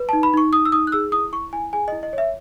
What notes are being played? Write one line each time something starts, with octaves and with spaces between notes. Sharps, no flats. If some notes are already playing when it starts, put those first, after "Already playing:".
Already playing: B4
A5
D#4
B5
D#4 C#6
D#4 D#6
E6
D#4 D#6
F#6
G#4 E6
E4 D#6
E4 C#6
E4 G#5
G#4 G#5
D#5
E4
D#5
C#5 E5